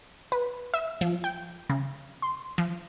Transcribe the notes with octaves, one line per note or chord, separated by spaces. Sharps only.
B4
E5
F3
G5
C#3
C6
F3